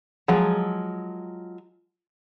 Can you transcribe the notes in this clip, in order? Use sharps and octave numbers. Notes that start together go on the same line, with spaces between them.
F3 F#3 G#3